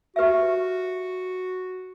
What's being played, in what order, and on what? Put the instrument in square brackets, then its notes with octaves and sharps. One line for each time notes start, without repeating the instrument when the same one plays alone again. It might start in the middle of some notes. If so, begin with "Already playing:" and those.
[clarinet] F#4 [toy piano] G4 B4 E5